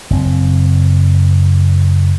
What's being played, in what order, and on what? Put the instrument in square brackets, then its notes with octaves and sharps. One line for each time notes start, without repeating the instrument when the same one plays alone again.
[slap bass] F#1 C4